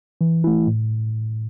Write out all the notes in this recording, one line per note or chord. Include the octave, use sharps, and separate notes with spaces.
E3
A3 E4
A2